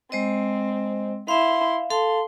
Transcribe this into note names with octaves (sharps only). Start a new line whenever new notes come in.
G#3 C4 C5 D#5
E4 E5 F5 C6
A4 F5 A5 C6